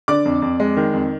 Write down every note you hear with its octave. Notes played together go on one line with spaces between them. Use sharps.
D3 D5 D6
F2
F2
G#3
D#3
F2